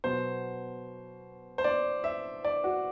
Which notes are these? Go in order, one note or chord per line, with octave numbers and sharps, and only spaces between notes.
B2 F#3 C5
C5
D5
E5
D5
F#4